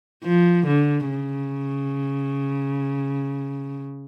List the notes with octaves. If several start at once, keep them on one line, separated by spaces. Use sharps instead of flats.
F3
D3
C#3